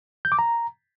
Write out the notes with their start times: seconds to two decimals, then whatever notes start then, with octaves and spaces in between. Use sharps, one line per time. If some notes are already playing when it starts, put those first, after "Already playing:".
0.25 G6
0.32 D6
0.39 A#5